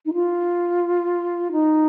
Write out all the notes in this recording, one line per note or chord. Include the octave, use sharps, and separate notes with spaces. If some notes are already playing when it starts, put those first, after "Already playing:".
D#4
F4
D#4